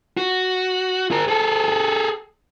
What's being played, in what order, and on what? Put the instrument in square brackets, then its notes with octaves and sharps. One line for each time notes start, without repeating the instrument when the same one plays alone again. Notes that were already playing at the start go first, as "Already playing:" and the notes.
[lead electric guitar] F#4
G#4 A#4
G#4 A4